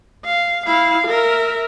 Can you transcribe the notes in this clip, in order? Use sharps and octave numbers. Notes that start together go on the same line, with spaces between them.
F5
E4 F5
A#4 E5